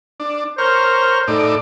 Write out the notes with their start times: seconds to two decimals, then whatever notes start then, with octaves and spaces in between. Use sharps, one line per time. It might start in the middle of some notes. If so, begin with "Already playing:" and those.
0.20 D4
0.58 A#4 C5 C#5 F6
1.28 A2 D#4 D5